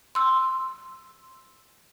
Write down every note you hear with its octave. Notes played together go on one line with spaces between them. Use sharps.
C6 E6